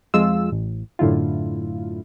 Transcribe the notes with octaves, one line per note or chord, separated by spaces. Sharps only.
F2 F3 G#3 F4 E6
A1
F#2 A2 D3 E4 F4